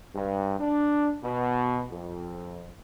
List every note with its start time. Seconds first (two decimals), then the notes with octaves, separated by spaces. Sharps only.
0.14 G2
0.59 D4
1.23 B2
1.92 F2